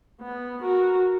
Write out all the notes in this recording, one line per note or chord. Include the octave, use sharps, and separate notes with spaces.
B3
F#4 A#4